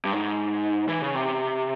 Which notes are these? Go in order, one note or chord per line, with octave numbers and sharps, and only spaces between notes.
G2
G#2
E3
C#3
C3